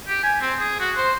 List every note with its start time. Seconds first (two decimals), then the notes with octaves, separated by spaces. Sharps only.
0.08 G4
0.23 G#5
0.41 C4
0.59 G#4
0.80 F#4
0.97 C5